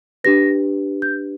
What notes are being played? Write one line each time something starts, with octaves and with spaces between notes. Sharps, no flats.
D4 G4 B4 A#6
G6